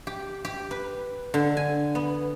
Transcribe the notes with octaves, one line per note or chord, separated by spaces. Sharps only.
G4
G4
B4
D3
G#5
B3